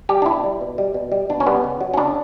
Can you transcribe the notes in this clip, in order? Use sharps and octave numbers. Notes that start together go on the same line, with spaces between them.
G3 G4
D4
B2 E4
G3
B2
G3
B2
G3
B2 D4
C#4
G3 B3
C#3
F#3
C#4
C#3 D4